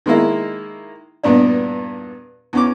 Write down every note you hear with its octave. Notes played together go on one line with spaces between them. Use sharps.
D#3 G#3 A#3 E4
E2 G2 A#2 B3 D4
E2 C#4 D6